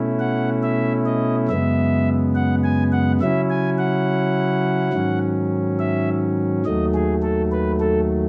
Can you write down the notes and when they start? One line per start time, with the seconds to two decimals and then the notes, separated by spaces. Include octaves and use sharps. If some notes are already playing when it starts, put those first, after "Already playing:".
Already playing: B2 A3 C#4 E4
0.19 F#5
0.63 E5
1.06 D#5
1.48 F#2 C#3 G#3 B3 E5
2.35 F#5
2.64 G#5
2.92 F#5
3.21 C#3 F#3 C#4 E4 E5
3.50 G#5
3.78 F#5
4.93 G#2 D#3 F#3 C#4
5.79 E5
6.65 D#2 D#3 F#3 A3 D#5
6.94 G#4
7.22 A4
7.52 B4
7.80 A4